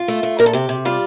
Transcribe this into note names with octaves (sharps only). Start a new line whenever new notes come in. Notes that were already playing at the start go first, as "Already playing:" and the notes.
Already playing: F4
A3
A3
A#2 A#4
A4
C3 G4
C3
G3 F4